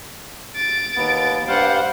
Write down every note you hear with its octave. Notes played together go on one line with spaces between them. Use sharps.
A6 D7
D#2 B3
G2 G3 C5 F5 F#5